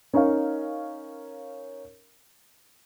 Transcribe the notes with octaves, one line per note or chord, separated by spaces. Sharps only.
C#4 D#4 A#4 C#5 F5